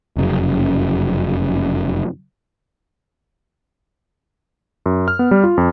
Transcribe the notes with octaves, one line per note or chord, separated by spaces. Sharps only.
F1 F#2 C#3
F#2
F6
B3
G3
F4
F2